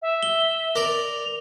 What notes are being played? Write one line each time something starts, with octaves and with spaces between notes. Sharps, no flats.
E5
G7
A#4 D5 F7